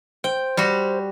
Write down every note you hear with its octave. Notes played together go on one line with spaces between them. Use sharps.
C5 G5
G3 F#4